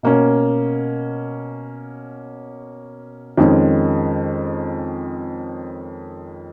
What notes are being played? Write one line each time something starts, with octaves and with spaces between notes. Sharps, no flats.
B2 A#3 C#4
F2 D#3 G#3 C#4